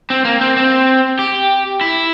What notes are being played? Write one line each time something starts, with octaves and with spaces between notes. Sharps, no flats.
C4
A#3
C4
C4
G4
E4